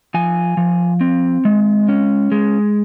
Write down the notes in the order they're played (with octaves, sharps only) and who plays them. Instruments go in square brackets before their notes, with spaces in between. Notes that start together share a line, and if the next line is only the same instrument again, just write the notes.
[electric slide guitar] F3 G#5
F3
C4
G#3
C#4
G#3